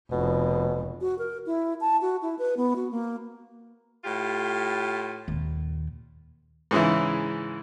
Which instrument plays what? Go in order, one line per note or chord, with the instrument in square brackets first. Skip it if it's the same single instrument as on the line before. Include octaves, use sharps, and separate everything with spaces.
[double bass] F1 [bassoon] B2
[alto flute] F#4
A#4
E4
A5
F#4
E4
B4
B3
F#4
A#3
[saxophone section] A2 F4 G4
[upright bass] D#2 A#2
[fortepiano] G#2 C#3 E3 E4